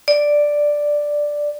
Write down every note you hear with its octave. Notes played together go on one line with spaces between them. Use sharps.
D5